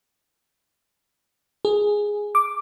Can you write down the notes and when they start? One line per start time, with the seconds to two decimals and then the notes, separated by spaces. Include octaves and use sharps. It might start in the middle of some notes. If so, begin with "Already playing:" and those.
1.65 G#4
2.35 D6